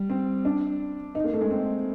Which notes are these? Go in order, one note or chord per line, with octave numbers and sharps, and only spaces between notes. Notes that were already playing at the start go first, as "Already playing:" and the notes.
Already playing: G3
C4
D4
D#4
A#3
A3
G#3
C4